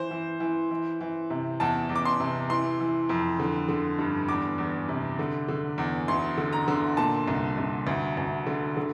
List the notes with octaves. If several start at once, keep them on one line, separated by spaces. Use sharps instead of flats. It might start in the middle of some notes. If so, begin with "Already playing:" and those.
Already playing: E3 C5
E3
E3
E3
E3
C3
E2 A5
E2
D6
C6
C3
E3 C6
E3
F2
D3
D3
G2
E2 D6
E2
C3
D3
D3
E2
D2 C6
D3
A#5
D3
A#2 A5
C2
C2
D2
D2
D3
D3